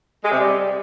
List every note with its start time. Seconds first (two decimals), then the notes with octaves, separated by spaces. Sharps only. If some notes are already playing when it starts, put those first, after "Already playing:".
0.24 G#3
0.32 C3
0.39 G3